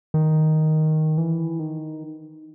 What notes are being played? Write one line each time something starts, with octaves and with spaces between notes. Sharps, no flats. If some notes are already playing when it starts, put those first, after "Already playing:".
D#3
E3
D#3